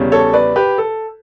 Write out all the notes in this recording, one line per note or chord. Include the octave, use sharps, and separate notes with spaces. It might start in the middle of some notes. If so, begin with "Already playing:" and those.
Already playing: E2 C#3 G3 C#4
A4 C#5
B4 D5
G4 B4
A4